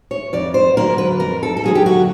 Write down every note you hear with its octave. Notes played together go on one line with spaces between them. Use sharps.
C#5
F2 D5
C5
D3 F#3 A#3 A#4
B4
F2 A#4
A4
A4
D3 F#3 A#3 G#4
G4
F#4